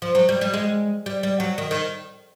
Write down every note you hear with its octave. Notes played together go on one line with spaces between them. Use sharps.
F3
F#3
G3
G3
G#3
G3
G3
F#3
D#3
D#3